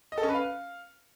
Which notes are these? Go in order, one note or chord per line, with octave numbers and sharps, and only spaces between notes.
D#5
A4
C#4
B4
F5